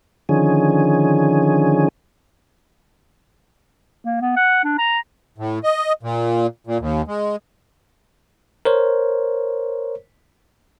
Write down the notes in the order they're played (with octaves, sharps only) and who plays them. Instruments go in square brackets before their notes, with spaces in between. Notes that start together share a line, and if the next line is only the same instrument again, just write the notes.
[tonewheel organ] D3 D#3 F3 C#4 G#4
[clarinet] A#3
B3
F#5
D4
A#5
[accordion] A2
D#5
A#2
A#2
D#2
G#3
[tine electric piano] A#4 C5 C#5